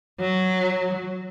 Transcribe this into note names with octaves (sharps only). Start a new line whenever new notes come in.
F#3